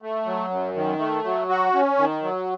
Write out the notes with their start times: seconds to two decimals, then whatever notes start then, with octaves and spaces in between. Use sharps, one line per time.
0.02 A3
0.26 F#3
0.50 F#2
0.75 D#3
0.99 A3
1.24 F#3
1.49 F#4
1.73 C#4
1.98 D#3
2.22 F#3